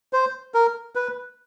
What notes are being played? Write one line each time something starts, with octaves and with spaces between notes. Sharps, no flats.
C5
A#4
B4